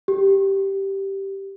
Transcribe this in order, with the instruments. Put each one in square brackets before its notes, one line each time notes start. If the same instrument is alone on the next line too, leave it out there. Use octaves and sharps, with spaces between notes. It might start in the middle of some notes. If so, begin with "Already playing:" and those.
[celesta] G4